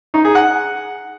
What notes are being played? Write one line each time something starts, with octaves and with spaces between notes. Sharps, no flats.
D#4
G#4
F#5